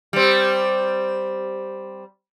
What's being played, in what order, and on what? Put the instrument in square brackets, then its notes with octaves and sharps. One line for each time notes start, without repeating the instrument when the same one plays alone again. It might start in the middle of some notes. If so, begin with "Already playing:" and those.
[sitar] G3 C4